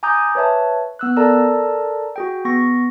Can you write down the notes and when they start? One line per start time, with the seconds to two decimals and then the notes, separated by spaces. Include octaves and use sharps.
0.03 G#5 A#5 D6 D#6 G6
0.35 B4 C#5 E5 A5
0.99 B3 E6 F#6
1.17 A4 A#4 D5 A5 A#5 E6
2.16 F#4 G#4 G5
2.45 B3 C#6 A#6